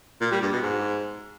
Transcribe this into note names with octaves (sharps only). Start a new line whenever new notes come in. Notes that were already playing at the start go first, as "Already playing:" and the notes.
A#2
G3
G2
B2
G#2